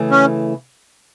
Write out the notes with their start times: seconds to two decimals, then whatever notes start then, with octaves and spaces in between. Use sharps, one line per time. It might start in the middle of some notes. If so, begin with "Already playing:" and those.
Already playing: C#3 E3 A3
0.11 C#4